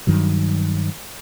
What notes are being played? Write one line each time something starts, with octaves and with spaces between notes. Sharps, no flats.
G2 D#3 F#3